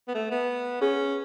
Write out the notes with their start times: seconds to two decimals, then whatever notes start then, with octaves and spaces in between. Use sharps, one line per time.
0.08 B3
0.14 A3
0.31 B3
0.81 C#4 G#4